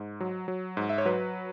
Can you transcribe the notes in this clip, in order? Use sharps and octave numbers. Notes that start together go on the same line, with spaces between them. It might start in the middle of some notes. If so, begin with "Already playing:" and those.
Already playing: G#2
F#3
F#3
G#2
E5
C#5
F#3 B4